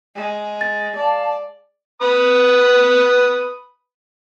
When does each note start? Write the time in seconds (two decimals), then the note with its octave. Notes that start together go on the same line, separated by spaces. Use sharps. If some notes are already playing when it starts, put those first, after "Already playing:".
0.15 G#3
0.61 A6
0.96 D5 F5 A5
2.02 B4 B5 D#6